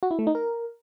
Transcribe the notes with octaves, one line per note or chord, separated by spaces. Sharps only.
F#4
E4
A3
D#4
A#4